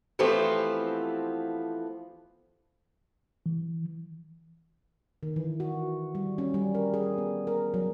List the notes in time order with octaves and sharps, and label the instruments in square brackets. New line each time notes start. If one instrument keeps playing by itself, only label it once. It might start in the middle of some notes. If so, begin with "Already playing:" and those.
[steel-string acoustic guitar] E3 F3 A3 B3 C4 G4
[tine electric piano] E3
[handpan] D#3
E3
F#4
G3
C#4
G3
A#4
G#4
B3
A#4
F#3